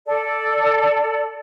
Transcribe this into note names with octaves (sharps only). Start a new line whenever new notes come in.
A4 D5